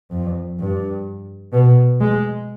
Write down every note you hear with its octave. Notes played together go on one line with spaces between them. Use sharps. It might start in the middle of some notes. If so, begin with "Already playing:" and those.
F2
G2
B2
G#3